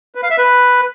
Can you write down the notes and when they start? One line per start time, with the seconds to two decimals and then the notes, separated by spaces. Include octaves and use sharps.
0.15 B4
0.23 F5
0.31 E5
0.38 B4